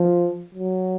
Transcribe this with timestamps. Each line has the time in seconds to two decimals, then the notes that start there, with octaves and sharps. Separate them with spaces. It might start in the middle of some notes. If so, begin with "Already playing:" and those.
Already playing: F3
0.55 F#3